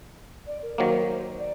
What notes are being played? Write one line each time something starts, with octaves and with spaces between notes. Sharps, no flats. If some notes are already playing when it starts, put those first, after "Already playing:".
D5
A#4
D#3 F#3 A#3 C5
D5